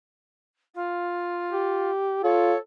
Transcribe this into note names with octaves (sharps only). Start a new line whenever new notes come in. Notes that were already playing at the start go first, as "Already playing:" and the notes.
F4
G4
F4 A4 C#5